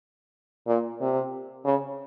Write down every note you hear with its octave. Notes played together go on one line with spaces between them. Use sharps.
A#2
C3
C#3